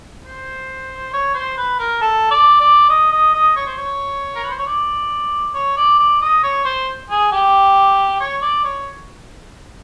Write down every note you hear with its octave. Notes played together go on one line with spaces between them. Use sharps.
C5
C#5
C5
B4
A#4
A4
D5
D5
D#5
D#5
D#5
C#5
C5
C#5
A#4
B4
C5
C#5
D5
C#5
D5
D5
D#5
C#5
C5
G#4
G4
C#5
D5
C#5